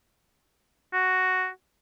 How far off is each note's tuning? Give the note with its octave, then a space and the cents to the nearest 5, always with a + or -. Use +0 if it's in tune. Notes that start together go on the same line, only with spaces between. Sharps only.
F#4 +5